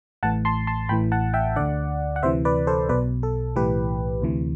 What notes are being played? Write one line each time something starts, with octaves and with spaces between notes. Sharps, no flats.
A1 A2 E3 F#5 A5
A5 C6
A5 C6
A1 A2 E3 G5 B5
F#5 A5
E5 G5
D2 D3 D5 F#5
F#5
D2 C3 E3 C5 E5
B4 D5
A4 C5
B1 B2 B4 D5
A4
B1 A2 E3 G4 B4
D2 C3 E3